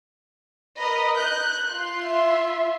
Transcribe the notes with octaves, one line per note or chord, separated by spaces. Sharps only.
A#4 B4 D#5 B5
F#6 G6
F4 C6
E5